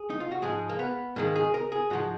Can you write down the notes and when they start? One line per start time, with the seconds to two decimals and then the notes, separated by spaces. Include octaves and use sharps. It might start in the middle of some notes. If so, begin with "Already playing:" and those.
Already playing: G#4
0.10 D#4
0.20 F4
0.32 F#4
0.42 G#2 F3 G#3 G#4
0.69 A#3
0.79 B3
1.16 G#2 D#3 G#3 A#3
1.36 G#4
1.54 A#4
1.72 G#4
1.90 G#2 F3 G#3 F#4